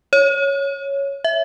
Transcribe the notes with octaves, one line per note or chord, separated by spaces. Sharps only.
C#5
E5